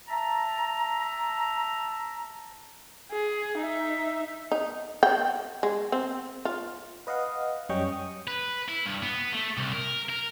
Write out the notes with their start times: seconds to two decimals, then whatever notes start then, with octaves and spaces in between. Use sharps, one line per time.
0.08 E5 A5 A#5
3.11 G#4
3.58 D#4 E5
4.52 D#4
5.03 G5
5.63 G#3
5.92 C4
6.45 F4
7.07 B4 D#5 F5 F#5
7.69 F#2 G3 C#4 D#5 G5 C#6
7.92 D#6
8.28 B4
8.69 E4
8.86 G2
9.03 B3
9.32 A3
9.57 C2
9.73 A#4
10.10 A#4